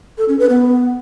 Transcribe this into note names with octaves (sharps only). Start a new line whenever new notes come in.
A4
C#4
B4
B3